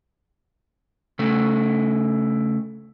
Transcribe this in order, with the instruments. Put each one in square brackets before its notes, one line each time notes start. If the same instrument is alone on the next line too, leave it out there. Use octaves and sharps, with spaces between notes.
[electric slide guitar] C#3 A3